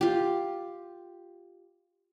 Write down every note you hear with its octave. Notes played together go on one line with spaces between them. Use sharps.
F4 G4